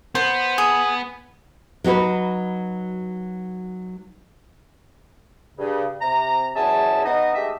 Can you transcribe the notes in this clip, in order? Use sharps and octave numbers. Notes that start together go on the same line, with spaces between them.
B3 C5
G#4
F#3 D#4 F#4 B4
G2 C#3
C3 A#5
E2 F#3 C#4 G#4 E5 A5
B3 D#4 D#5
G#3 A3 G4 D#5 E5